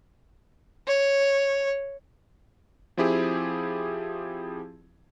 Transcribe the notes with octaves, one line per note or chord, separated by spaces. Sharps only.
C#5
F3 C4 E4 G4 G#4